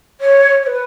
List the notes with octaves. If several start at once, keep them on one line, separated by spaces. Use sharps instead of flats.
C#5
C#5
B4